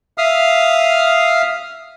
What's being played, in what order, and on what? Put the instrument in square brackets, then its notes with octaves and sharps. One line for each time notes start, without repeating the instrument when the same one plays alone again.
[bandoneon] E5 F5 D#6 F6